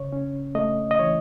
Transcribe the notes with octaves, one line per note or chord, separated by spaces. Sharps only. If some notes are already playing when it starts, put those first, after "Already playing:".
Already playing: C#3 C#5
C#4
A3 D#5
D#5
E3 C#5